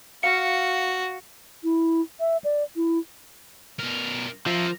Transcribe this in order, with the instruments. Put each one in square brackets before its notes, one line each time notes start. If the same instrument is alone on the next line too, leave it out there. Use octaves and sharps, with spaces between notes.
[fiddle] F#4 [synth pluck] F5 C#7
[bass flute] E4
E5
D5
E4
[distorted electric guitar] B2 A#4
[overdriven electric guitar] F3 [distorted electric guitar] A#4 E5